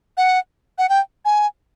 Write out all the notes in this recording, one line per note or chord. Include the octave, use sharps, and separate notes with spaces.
F#5
F#5
G5
G#5